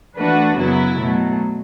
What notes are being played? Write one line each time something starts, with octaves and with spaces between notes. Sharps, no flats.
E3 A3 D4 F#4 B4
F#2 C#3 F#3 B3 E4
B2 F#3 A3